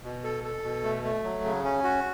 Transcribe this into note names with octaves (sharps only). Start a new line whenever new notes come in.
B2
A4
A4
B2
A3
A3
F#3
C#3
C#4
F#4